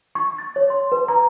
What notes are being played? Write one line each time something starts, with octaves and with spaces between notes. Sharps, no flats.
C#6
A6
C#5
C6
B4
A#5